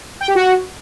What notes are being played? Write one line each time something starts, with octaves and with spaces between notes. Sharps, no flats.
G5
G4
F#4